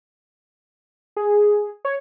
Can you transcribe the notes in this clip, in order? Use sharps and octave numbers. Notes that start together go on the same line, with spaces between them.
G#4
C#5